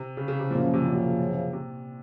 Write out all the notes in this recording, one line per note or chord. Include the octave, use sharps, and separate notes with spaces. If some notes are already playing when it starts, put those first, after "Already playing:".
Already playing: C3
C#3
C#3
C3
F#2 A#2 C#3 F3
A#2
C3
A#2
C3
C3